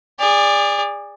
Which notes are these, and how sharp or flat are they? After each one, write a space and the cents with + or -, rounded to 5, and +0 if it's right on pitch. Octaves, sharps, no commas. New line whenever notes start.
G#4 -30 D5 +0